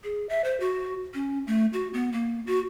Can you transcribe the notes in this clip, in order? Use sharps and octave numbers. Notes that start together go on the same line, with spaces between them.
G#4
E5
C5
F#4
C#4
A3
F#4
B3
A#3
F#4